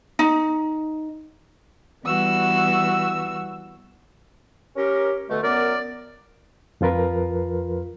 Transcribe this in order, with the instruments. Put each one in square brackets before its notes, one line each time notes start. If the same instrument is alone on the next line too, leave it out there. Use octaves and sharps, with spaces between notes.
[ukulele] D#4
[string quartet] E3 G3 B3 F#4 E6
[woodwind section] C#4 G4 A#4
B2 D3 A3
[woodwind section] F#2 B3 A#4 [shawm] D5
[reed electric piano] F2 F3 F4 A#4 B4